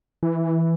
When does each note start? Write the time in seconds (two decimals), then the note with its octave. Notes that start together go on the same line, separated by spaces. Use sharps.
0.23 E3